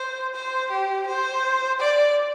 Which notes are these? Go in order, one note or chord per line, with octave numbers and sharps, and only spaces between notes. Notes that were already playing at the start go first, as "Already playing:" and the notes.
Already playing: C5
C5
G4
C5
D5